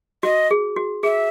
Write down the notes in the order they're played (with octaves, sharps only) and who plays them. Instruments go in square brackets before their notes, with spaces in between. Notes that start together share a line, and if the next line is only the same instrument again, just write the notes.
[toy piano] F#4 [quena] D#5
[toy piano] G#4
F#4
[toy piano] G#4 [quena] E5